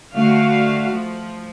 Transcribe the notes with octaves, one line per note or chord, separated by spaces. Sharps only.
D3 A3 F#4 F5
F3